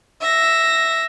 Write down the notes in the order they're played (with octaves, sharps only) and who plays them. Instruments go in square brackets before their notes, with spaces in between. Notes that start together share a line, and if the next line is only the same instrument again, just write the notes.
[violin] E5 A#6